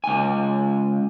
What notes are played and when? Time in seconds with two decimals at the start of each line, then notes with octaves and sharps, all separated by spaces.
0.04 C#2 G#5